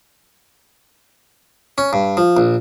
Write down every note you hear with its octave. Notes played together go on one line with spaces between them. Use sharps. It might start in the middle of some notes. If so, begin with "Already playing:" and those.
C#4
G2
F3
A#1